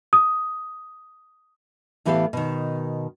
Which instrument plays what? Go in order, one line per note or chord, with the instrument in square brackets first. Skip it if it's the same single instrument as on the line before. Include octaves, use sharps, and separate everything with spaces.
[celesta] D#6
[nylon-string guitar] A2 E3 B3 G4 A4 F5
B2 D#3